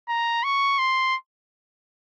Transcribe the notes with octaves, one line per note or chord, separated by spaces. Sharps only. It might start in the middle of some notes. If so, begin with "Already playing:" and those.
A#5
C#6
C6